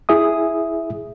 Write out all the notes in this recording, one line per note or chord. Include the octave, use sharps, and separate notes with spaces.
E4 G#4 E5 D#6